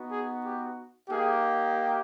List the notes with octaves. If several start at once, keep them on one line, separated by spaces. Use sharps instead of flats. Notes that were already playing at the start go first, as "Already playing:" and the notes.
Already playing: B3 D#4 F#4
G#4
G4
A#3 D#4 G4 G#4